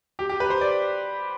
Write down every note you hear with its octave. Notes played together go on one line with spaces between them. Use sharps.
G4
G4
B4
C5
D5